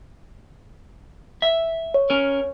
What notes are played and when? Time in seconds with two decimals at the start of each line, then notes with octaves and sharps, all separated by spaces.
1.42 E5
1.94 C#5
2.10 C#4 A#4